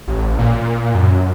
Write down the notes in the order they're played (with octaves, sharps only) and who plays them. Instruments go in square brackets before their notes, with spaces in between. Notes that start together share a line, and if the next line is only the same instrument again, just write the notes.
[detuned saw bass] A1
A#2
F#2